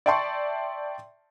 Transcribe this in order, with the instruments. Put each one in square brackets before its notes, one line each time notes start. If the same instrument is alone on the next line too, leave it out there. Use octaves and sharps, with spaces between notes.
[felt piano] D5 E5 G5 A5 C6 C#6